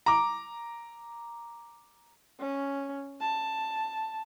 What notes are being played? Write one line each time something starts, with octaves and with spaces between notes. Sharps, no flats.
A#5 D6
C#4
A5